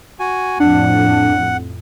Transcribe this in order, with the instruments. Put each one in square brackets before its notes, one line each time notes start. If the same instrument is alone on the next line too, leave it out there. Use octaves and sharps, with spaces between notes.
[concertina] F#4 G#5
[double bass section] F2 A2 [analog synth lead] D4 [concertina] F#5